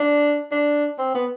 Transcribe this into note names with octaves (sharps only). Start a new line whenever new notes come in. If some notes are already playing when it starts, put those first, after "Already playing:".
Already playing: D4
D4
C4
B3